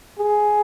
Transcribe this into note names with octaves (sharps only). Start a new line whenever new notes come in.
G#4